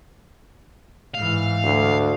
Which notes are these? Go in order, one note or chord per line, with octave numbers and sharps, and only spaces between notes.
G#2 E3 F5
D2